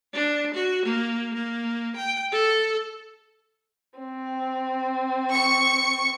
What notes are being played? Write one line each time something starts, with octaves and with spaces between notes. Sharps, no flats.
D4
F#4
A#3
A#3
G5
A4
C4
C#6 C#7